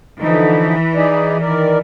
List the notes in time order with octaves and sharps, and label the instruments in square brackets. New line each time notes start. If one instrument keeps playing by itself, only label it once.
[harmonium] D3 F3 D#4 [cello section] E3
[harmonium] D#4 G#4 D5
D#3 A#4 D5